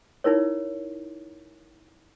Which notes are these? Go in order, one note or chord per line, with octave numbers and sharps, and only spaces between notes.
D#4 E4 A#4 C#5